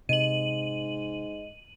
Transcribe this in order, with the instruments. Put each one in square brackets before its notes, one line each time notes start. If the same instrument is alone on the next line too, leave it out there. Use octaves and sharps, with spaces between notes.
[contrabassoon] G#2 [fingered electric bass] C3 [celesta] D#5 [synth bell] D#7 F#7